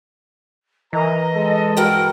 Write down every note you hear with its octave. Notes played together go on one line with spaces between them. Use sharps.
E3 A#4 D#5 A#5
G#3 A4
G2 F#4 A#4 G5